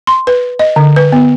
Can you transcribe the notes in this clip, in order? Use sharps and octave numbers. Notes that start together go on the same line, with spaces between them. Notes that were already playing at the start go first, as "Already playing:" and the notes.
C6
B4
D#5
D3
B4
B3